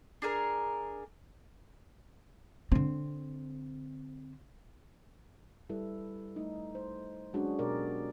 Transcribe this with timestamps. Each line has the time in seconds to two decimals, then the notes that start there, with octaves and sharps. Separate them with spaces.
0.22 D4 G#4 A#4
2.72 D3 C4
5.69 G3 E4 A4 B4
6.36 A3 D#4
6.75 C5
7.33 F#3 G#3 C#4 D4 F#4 G#4
7.59 B2 G4 G#4 A#4 D5